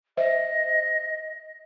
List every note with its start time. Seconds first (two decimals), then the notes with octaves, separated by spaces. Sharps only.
0.17 C5 D#5 E5